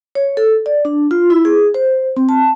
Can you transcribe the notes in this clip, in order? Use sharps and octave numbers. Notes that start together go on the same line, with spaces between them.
C#5
A4
D5
D4
F4
E4
G#4
C5
C4
A5